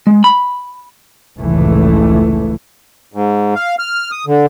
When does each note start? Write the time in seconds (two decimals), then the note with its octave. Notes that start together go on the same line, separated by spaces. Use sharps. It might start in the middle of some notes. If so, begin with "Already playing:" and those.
0.07 G#3
0.24 B5
1.39 F1 C#2 A2 E3 A3
3.14 G#2
3.55 F5
3.79 F6
4.11 D#6
4.27 D3